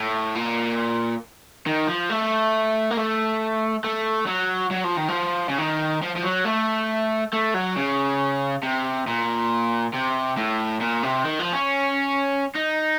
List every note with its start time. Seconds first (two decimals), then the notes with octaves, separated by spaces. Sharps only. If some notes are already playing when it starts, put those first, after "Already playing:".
Already playing: A2
0.35 A#2
1.66 D#3
1.87 F3
2.10 A3
2.91 A#3
2.97 A3
3.84 A3
4.27 F#3
4.71 F#3
4.84 F3
4.97 D#3
5.09 F3
5.49 C#3
5.59 D#3
6.02 F3
6.16 F3
6.23 F#3
6.45 A3
7.33 A3
7.54 F#3
7.76 C#3
8.63 C3
9.07 A#2
9.93 C3
10.37 A2
10.81 A#2
11.03 C3
11.25 D#3
11.40 F3
11.53 C#4
12.55 D#4